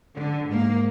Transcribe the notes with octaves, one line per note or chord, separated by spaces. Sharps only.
D3
G#2 A#3